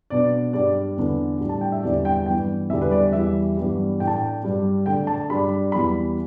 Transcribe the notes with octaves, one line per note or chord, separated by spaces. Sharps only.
B2 B3 D4 D5
G2 G3 D4 D5
E2 D3 B3 D4
A2 G3 D4
A5
G5
E5
E2 D3 G3 D4 D5
G5
G2 E3 B3 G5
E2 D3 G3 E5
B4
D5
E2 E3 G3 E5
G2 E3 G3 B3
A2 A3 D4 G5
A5
G5
G2 G3 D4
D3 A3 D4 G5
A5
G2 G3 D4 B5
E2 E3 G3 B3 B5